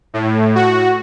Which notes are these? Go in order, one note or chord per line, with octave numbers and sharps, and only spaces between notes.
A2
F#4